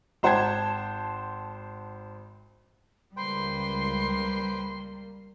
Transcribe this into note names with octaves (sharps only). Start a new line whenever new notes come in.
G#1 C5 F#5 G5 A5 G#6
C#2 G3 A#3 B4 C5 G5 C6